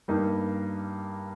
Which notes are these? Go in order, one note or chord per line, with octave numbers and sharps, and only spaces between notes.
G2 G3 A#3 D#4